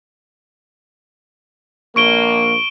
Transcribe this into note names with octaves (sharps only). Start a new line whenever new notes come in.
A#1 A#3 C#6 D7 G7